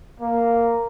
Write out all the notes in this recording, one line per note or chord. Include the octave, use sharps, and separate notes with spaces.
A#3